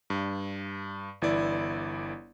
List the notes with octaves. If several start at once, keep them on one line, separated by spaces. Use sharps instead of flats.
G2
G1 E3 E4 D5